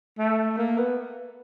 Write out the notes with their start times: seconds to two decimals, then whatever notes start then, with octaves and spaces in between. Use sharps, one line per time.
0.18 A3
0.57 A#3
0.77 B3